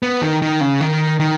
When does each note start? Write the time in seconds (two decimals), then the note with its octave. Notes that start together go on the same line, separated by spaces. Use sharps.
0.03 B3
0.22 D#3
0.42 D#3
0.61 C#3
0.81 D#3
1.20 D#3